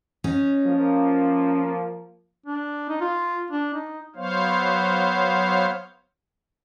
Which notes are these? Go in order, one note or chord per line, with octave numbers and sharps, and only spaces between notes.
C#4 D#4
F3 A#3
D4
D#4
F4
D4
D#4
F#3 B3 C5 C#5 F5